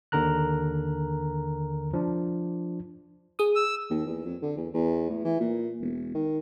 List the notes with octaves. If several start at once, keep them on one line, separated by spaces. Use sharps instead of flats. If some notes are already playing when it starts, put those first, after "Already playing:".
D#2 D3 A#4 A#5 F#6
F3 D4
G#4 D#6
E6
D#2
E2
F2
D3
E2
E2
A2
E3
A#2
E1
D#3